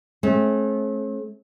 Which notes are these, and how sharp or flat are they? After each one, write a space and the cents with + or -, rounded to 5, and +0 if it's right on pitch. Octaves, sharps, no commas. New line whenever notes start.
A3 -40 C#4 -45